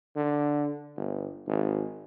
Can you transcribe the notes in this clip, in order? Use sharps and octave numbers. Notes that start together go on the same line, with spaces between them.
D3
G1
G#1